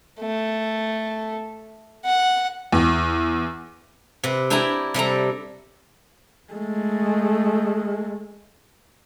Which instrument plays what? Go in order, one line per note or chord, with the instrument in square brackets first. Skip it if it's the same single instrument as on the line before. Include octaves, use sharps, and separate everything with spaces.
[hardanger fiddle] A3
F#5
[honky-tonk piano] E2
[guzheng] C3 B4
D4 E4 G5 G#5 A#5 B5
C3 G3 A4 A#5
[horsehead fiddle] G#3 A3